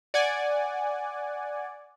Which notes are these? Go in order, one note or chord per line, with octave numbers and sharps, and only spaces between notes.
D5 F#5 G#5